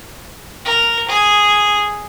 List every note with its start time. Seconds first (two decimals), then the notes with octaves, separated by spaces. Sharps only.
0.65 A#4
1.08 G#4